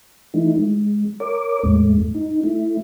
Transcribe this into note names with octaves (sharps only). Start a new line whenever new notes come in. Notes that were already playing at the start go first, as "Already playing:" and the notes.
E3 A3 D#4 E4
G#3
A#4 C#5 D6
E2 A2 G#3 A3
D#4
A3 E4